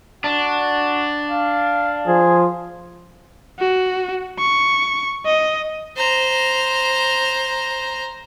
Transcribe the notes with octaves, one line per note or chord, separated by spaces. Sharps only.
D4 F#4
F5
F3 G#4
F#4
C#6
D#5
C5 A#5